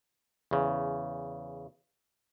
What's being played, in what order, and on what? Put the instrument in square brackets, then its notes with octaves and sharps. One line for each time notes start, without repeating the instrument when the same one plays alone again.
[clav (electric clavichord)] E2 C#3